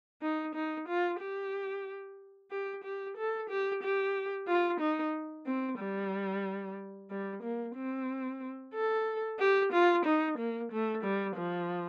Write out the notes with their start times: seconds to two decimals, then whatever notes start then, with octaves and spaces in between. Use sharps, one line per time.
0.22 D#4
0.55 D#4
0.88 F4
1.21 G4
2.51 G4
2.84 G4
3.17 A4
3.50 G4
3.83 G4
4.48 F4
4.81 D#4
5.47 C4
5.79 G3
7.11 G3
7.43 A#3
7.76 C4
8.75 A4
9.40 G4
9.73 F4
10.05 D#4
10.38 A#3
10.72 A3
11.04 G3
11.37 F3